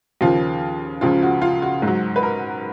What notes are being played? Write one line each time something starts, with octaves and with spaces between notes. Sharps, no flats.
D#2 C#3 F3 F4
C#2 C#3 F3 F4
F#4
F4
F#4
G#2
F#3
B4
A#4